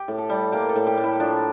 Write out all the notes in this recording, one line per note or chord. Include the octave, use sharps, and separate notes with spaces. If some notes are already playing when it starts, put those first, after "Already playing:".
Already playing: G4
A2
A4
G3
A#3 G4
A4
A2
G4
A2
E4
F3 D4